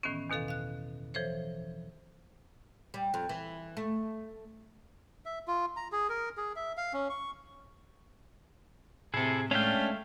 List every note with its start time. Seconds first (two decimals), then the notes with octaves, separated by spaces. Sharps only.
0.03 A2 D#3 E3 B3 C#4
0.30 E2 B2 D#3 A4 F5
0.48 F5 F#6
1.14 E3 F3 A4 C5 C#5
2.94 G3
3.14 F2
3.29 E3
3.77 A3
5.25 E5
5.48 F4
5.77 A#5
5.92 G#4
6.09 A#4
6.37 G#4
6.56 E5
6.77 F5
6.93 C#4
7.10 C#6
9.14 A2 C3 E4 G#4 A4
9.51 G#3 A3 C#4 D4 E5 F5 G5